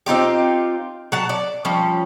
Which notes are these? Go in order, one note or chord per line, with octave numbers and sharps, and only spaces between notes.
C4 D#4 F4 G4
F#3 F#5 A5
D5
F3 G3 C#4